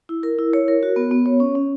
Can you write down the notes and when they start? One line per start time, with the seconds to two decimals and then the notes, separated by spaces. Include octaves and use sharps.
0.09 E4
0.23 A#4
0.39 E4
0.53 C#5
0.68 A#4
0.83 F#4
0.96 B3
1.11 B3
1.26 C#5
1.40 C#4
1.55 C#4